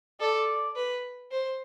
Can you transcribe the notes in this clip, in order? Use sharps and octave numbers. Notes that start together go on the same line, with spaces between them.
A4 D5
B4
C5